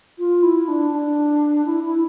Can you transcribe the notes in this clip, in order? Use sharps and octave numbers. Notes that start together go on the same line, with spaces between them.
F4
E4
D4
D4
E4
E4